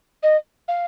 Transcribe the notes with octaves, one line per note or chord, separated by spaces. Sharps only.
D#5
F5